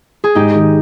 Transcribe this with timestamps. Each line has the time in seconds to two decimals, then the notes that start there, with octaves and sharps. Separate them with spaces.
0.24 G#4
0.35 G#2 D#4 G4
0.54 D#3 G#3